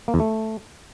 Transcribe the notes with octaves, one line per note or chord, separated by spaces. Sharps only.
A#3
E2
A3